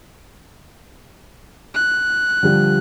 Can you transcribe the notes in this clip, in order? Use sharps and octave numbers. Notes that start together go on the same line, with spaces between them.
F#6
D3 F3 G3